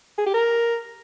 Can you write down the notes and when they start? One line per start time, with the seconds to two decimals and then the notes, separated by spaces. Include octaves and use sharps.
0.19 G#4
0.26 G4
0.34 A#4